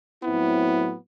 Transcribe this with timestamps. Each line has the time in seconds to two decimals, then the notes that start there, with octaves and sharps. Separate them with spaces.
0.23 A2 F#3 B3 C4 E4